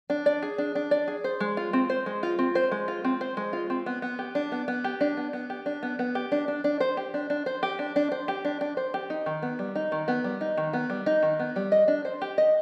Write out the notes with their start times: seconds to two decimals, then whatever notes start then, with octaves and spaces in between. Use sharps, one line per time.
0.10 D4
0.26 D5
0.43 G#4
0.58 D4
0.75 D4
0.91 D5
1.08 G#4
1.24 C5
1.40 G#3
1.57 F4
1.73 C4
1.90 C5
2.06 G#3
2.23 F4
2.39 C4
2.55 C5
2.72 G#3
2.88 F4
3.05 C4
3.21 C5
3.37 G#3
3.53 F4
3.70 C4
3.86 B3
4.02 B3
4.19 G4
4.35 D4
4.52 B3
4.68 B3
4.84 G4
5.01 D4
5.17 B3
5.33 B3
5.50 G4
5.66 D4
5.83 B3
5.99 B3
6.15 G4
6.32 D4
6.48 D4
6.64 D4
6.80 C5
6.97 G4
7.14 D4
7.30 D4
7.46 C5
7.63 G4
7.79 D4
7.96 D4
8.12 C5
8.28 G4
8.45 D4
8.61 D4
8.77 C5
8.94 G4
9.10 D#4
9.26 D#3
9.42 B3
9.59 G3
9.75 D#4
9.92 D#3
10.08 B3
10.24 G3
10.41 D#4
10.58 D#3
10.73 B3
10.90 G3
11.06 D#4
11.23 D#3
11.39 B3
11.56 G3
11.72 D#5
11.88 D4
12.05 C5
12.22 G4
12.38 D#5